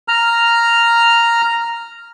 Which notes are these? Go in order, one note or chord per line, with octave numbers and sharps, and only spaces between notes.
A#5 F6